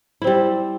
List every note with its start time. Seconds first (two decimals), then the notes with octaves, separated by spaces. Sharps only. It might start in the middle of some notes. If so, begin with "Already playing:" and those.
0.22 E4
0.24 C4
0.27 G3